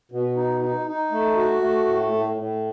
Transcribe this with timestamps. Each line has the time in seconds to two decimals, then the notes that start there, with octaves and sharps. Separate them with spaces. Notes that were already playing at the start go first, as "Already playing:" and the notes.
0.12 B2
0.36 D#4
0.61 D#4
0.87 D#4
1.12 A3
1.37 F#4
1.61 A3
1.86 A2
2.11 A2
2.37 A2